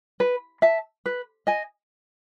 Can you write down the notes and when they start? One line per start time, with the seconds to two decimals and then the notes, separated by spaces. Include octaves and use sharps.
0.20 B4
0.62 E5 A5
1.06 B4
1.47 D#5 G#5